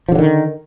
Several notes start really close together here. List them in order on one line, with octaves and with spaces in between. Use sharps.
F3 D3 F#3 D#3